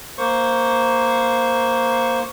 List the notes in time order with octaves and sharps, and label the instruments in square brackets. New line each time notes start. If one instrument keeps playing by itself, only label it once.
[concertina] A#3 C5 C#6